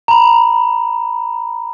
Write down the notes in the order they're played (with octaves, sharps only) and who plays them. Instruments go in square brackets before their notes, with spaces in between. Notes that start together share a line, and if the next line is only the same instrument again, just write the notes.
[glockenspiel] A#5 B5